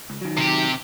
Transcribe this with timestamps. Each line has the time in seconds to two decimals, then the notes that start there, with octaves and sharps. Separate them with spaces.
0.10 C#2
0.21 D#3 F#3
0.38 C3 G4